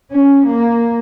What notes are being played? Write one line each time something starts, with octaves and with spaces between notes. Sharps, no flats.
C#4
A#3